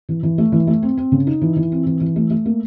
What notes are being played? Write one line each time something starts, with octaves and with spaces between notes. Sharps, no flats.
E3
E3
A3
E3
A3
C4
C4
C#3
D#4
E3
E3
C4
E3
E3
A3
A3
A#3